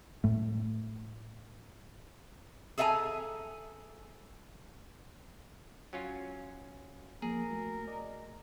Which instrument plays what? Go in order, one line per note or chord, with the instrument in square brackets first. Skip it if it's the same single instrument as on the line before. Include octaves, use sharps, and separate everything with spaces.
[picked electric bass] A2 A3
[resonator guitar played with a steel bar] G#4 A4 E5 F5 G#5 A#5
[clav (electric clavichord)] F#3 C#4 F4
[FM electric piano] F3 A#3 [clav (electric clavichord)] G#4 [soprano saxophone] A#4
[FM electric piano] A3 F#4
D5 D#5